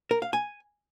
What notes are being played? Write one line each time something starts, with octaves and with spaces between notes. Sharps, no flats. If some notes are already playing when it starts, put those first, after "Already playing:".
A#4
F5
G#5